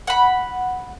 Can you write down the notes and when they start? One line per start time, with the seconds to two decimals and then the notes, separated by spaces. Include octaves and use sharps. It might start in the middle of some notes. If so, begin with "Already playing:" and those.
0.07 F#5 B5